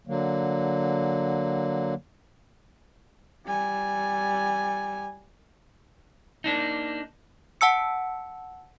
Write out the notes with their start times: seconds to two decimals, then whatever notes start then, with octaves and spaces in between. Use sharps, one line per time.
0.07 D3 F#3 A#3
3.46 G3 G#5
6.44 A#3 D4 D#4
7.61 F#5 A5 E6 C#7